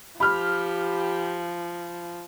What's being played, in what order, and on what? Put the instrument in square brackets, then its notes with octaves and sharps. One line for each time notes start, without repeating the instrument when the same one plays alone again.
[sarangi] F3 [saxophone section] G4 [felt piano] B5 F6